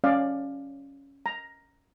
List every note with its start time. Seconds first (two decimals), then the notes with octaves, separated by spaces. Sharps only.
0.04 C#4 D5 F5
1.26 A#5